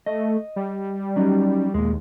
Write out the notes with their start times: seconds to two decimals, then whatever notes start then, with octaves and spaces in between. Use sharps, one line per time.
0.06 A3 D#5
0.56 G3
1.16 F#3 C#4 D#4
1.74 D#2 A#2 G#3